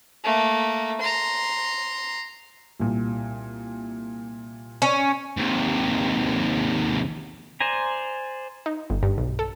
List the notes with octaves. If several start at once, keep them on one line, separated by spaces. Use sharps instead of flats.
A3 A#3
A#5 C6
C2 A#2
C#4
D#2 C3
C5 D5 G#5 A#5
D#4
G1
G2
B1
A4